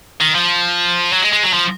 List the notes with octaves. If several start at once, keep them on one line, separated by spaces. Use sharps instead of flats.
D#3
F3
F#3
G#3
G#3
F#3
F3